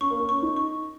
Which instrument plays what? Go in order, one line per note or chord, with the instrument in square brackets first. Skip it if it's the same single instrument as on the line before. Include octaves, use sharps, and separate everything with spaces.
[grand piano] C#4 [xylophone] C#6
[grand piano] A#3
C#4
[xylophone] C#6
[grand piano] D#4
[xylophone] C#6